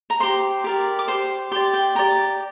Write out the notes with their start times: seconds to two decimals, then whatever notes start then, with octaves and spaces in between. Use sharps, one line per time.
0.10 A#5
0.20 G4 C5 C6
0.64 G4 A#4 D5
0.99 D6
1.08 G4 C5 C6
1.52 G4 D5 C6
1.73 G5
1.95 G4 D5 A#5